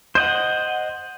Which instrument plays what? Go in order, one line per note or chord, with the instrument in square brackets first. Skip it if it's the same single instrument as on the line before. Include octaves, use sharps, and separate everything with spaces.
[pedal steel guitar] C5 D#5 F#5 [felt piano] G6